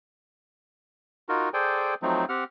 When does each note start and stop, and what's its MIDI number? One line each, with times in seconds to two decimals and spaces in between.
1.29 1.49 63
1.29 1.49 65
1.29 1.49 66
1.29 1.49 70
1.54 1.94 68
1.54 1.94 69
1.54 1.94 72
1.54 1.94 74
1.54 1.94 79
1.54 1.94 80
2.02 2.25 53
2.02 2.25 54
2.02 2.25 57
2.02 2.25 60
2.02 2.25 63
2.29 2.44 60
2.29 2.44 67
2.29 2.44 78
2.29 2.44 89